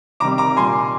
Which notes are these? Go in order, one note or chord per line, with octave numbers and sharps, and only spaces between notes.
C3 D#3 G3 A#5 D6
A#5 D6
A#2 G3 G#5 C6